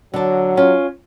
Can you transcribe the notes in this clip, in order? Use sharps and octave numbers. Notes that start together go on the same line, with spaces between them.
D3 F#3 A5
C#4 F4